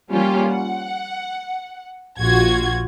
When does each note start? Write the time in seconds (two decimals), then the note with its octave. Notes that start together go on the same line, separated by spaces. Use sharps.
0.11 F3 G3 A#3 C#4 F4 G4
0.49 F#5
2.19 A#1 F4 F#4 G#6